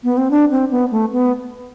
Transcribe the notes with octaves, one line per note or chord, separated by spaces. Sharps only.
B3
C4
D4
C4
B3
A3
B3